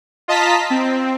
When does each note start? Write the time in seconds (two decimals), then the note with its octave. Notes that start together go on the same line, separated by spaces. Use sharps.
0.28 F4 D#5 A5 A#5 B6
0.70 C4